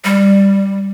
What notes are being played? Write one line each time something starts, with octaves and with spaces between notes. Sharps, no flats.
G3